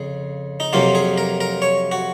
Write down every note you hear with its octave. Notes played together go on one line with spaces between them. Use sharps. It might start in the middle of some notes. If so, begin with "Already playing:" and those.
Already playing: F2 C#3 G#4
D#4
F2 C3 F#3 A#3 F4
G#4
A#4
A#4
C#5
F#4